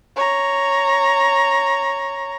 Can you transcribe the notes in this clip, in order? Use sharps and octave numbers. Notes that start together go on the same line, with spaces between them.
C#5 A#5